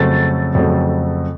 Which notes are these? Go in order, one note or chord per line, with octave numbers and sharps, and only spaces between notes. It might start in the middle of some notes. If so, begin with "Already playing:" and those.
Already playing: F2 C#3 F#3 A3 C4 A6
F2 C#3 F#3 A3 C4